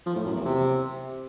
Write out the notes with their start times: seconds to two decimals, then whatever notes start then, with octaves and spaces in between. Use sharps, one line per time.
0.06 F3
0.16 A2
0.26 F#2
0.36 E2
0.45 C3